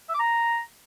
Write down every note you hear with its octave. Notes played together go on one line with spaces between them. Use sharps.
E5
D6
A#5